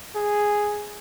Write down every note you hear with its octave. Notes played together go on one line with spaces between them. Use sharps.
G#4